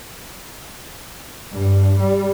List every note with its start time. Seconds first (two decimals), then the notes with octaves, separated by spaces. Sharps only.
1.51 G2
2.00 G3